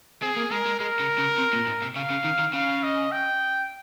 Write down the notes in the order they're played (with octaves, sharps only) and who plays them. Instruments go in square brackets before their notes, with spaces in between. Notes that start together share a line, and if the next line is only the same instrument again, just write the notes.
[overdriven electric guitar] C4 [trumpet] G#4
[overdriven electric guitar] A#3
[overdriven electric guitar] G#3 [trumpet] A#4
[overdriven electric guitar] G#3
[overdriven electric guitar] G#3 [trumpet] A#4
[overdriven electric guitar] C#3
C#3
C3
A#2
G#2
C3
[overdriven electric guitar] C#3 [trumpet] F5
[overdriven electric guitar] C#3
D#3
D#3
[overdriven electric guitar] C#3 [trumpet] F5
[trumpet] D#5
G5